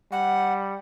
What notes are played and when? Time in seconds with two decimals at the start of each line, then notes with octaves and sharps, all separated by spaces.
0.12 G3 F#5